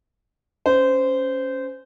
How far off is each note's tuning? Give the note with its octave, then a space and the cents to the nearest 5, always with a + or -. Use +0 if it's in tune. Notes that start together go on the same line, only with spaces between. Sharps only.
C#4 +5 C5 -20